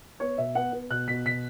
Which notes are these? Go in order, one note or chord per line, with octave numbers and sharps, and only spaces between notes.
B3 C#5
B2 E5
B3 F#5
B3
B2 F#6
B2 B6
B2 B6